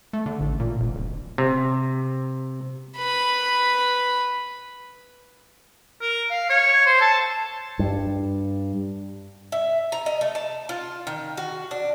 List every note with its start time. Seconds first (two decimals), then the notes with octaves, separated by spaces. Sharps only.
0.13 A3
0.26 D3
0.40 A1
0.60 A#2
0.80 F1
0.95 D1
1.38 C3
2.98 B4 B5
6.01 A#4
6.30 F5
6.50 C#5
6.86 C5
7.01 A5
7.79 G2
9.52 E5
9.92 A#5
10.06 D#5
10.21 A3
10.35 A5
10.69 F4
11.07 D#3
11.37 F#4
11.71 D4